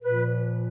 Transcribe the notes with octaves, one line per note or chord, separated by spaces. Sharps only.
A#2 F3 B4